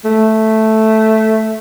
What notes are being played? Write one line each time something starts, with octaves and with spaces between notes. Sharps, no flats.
A3